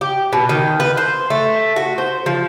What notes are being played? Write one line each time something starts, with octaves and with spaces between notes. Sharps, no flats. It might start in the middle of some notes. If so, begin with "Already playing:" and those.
G4
B2
D#3
B4
C5
A3
F#4
C5
F3